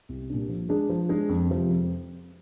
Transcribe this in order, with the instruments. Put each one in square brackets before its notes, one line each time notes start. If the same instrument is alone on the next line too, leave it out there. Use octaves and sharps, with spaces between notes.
[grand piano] C2
A#2 G3 D4
F3
G#3 D4 G#4
F3
G#3 D4 G#4
F2
C3 F3
F2